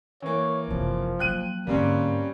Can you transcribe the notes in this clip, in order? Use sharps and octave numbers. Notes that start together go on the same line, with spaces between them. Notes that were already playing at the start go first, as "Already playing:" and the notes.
E3 A#3 C#5
F#1 C3 F3
F#3 A#3 G5 F#6 D#7
G#2 D3 G3 A#3 C4 C#4